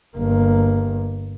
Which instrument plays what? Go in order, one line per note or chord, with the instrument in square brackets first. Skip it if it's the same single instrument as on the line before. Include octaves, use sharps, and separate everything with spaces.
[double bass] G1 A#3